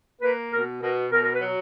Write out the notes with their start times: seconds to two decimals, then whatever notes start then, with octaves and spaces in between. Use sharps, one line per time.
0.21 A#3 B4
0.52 B2 A#4
0.81 B2 A#4
1.11 B2 A#4
1.23 A#4
1.34 B4
1.41 F#3